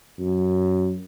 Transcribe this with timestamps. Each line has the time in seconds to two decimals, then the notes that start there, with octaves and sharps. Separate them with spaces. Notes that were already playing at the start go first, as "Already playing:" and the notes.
0.19 F#2